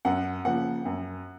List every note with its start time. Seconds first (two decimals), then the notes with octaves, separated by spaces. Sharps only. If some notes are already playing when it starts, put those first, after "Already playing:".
0.05 F#2 F#5
0.45 C#3 F3 A#3 F#5
0.85 F#2